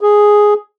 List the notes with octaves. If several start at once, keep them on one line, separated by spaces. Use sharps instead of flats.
G#4